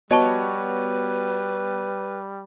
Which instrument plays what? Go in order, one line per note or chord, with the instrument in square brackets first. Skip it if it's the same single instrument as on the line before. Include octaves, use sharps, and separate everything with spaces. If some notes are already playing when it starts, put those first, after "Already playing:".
[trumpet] G3 [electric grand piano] B3 F#4 C#5 [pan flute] B4 [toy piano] D#5 A5 C#6